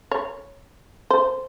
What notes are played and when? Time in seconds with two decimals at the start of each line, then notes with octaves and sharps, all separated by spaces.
0.11 C#5
1.10 C5